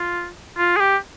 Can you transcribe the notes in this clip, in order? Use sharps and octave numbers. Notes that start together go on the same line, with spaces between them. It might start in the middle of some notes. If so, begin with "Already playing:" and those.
Already playing: F4
F4
G#4
G4